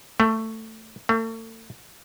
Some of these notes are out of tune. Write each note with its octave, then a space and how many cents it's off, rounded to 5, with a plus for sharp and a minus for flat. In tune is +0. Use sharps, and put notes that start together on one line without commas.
A3 +15
A3 +40